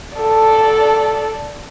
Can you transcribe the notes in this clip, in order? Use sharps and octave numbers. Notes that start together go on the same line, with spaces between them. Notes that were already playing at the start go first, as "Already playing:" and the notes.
A4 D5